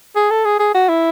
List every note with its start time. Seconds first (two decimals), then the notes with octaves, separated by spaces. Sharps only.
0.16 G#4
0.30 A4
0.45 G#4
0.60 G#4
0.74 F#4
0.89 E4